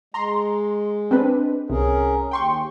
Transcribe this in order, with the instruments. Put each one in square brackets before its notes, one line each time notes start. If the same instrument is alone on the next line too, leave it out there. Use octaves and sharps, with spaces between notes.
[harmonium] G#3 [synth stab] A#5 C6
[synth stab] C4 D4 B4
[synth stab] C2 [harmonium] C#4 G#4 A#4
[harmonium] D#2 [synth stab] G5 C6 C#6